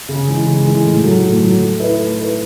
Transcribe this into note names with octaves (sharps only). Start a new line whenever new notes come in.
C#3
E3 G#3
C#3
E3 G#3
A2
F#3 A3
A2
F#3 A3
A3
E4 B4
A3
E4 B4